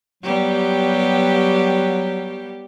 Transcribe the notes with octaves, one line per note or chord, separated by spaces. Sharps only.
F#3 G3 B3 G4